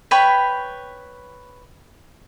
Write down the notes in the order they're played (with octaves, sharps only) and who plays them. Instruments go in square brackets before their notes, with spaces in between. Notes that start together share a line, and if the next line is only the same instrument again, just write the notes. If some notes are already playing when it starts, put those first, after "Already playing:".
[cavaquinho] B4 C#5 G5 B5